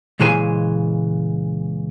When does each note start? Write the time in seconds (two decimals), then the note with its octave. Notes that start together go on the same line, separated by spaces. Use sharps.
0.20 C#2 A#2 E3 G#3 C5 G#5